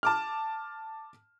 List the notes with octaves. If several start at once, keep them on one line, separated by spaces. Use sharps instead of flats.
A5 D6 F6